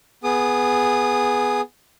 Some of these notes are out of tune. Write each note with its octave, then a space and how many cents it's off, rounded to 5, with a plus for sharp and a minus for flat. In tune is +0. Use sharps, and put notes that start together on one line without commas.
B3 +0 G#4 +0 D#6 -25